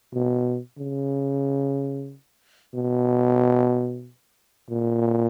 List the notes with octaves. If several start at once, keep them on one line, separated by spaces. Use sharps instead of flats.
B2
C#3
B2
A#2